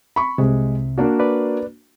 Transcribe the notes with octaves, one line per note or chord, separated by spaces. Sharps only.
B5 C#6
C2 C3 G#3
A#3 D4 F#4
B4 D5